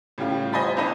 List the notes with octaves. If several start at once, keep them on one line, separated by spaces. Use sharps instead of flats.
A2 C#3 G3 F4 G4
C5 D#5 G#5 B5 A6 B6
G1 D4 E4 D#5 B5 D#7